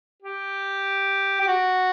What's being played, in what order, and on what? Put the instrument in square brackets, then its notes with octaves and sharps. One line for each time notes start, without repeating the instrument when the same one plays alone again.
[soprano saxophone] G4
G4
F#4